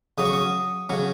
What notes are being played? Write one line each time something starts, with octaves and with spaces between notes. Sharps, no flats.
C#3 F#3 C#4 D#6
C#6
D#6
C#3 F#3 C#4